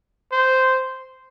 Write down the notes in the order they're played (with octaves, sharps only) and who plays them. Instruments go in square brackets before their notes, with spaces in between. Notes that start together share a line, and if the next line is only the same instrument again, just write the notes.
[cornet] C5